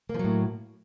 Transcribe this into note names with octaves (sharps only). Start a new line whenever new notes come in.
A2 F3 F#3 A#3